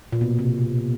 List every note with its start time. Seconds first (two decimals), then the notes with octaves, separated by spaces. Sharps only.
0.12 A#2
0.21 B2
0.39 C3